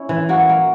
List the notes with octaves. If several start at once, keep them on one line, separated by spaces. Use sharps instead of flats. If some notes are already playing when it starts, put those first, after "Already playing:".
Already playing: C#4 E4
E3
A#3 F#4
A#3